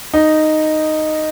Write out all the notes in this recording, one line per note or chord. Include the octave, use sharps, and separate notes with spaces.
D#4